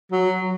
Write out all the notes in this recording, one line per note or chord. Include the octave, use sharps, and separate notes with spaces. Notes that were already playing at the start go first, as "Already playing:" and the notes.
F#3